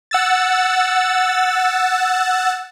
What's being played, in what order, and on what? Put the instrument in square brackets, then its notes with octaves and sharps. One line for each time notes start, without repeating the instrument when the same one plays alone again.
[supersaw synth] F#5 E6 A6